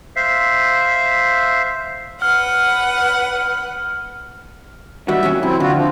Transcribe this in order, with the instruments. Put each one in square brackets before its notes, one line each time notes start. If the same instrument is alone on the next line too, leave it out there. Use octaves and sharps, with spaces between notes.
[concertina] C5 E5 F5
[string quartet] B4 F#5 [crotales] F6
[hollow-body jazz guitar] D#3 G3 F#4 [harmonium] E5
[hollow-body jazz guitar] F2 F#3 C#4
[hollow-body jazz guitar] F#2 [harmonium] C4 E4
[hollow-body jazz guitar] D3 [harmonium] F4 F#4
[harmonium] F3